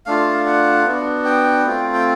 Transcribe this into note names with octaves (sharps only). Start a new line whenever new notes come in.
A3 D4 F4 F5
F#5
B3 D4 F#4
G5
A3 C4 F4
G5